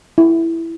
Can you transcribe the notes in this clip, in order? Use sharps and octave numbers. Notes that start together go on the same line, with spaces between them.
E4